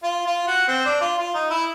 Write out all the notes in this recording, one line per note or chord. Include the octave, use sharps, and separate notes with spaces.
F4
F4
F#4
C4
D4
F4
F4
D#4
E4